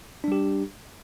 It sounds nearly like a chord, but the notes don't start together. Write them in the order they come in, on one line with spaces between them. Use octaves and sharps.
D4 G3 G4